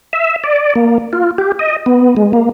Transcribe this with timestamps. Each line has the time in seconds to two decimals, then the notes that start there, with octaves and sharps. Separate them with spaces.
0.13 E5
0.44 D5
0.75 A#3
1.13 F4
1.38 G4
1.59 D#5
1.86 B3
2.17 G#3
2.33 A#3